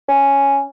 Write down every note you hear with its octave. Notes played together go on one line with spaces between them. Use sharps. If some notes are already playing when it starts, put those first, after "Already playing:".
C#4